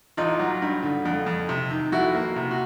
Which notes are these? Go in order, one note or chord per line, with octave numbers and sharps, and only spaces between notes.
A1 D#4 F4
F#3
G2
D3
F2
F2
C3
D#3
F2 E4 F#4
A#3
C3
F#4